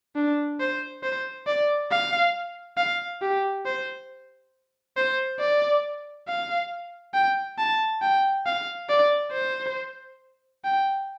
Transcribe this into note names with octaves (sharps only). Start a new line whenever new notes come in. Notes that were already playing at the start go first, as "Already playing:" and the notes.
D4
C5
C5
D5
F5
F5
G4
C5
C5
D5
F5
G5
A5
G5
F5
D5
C5
G5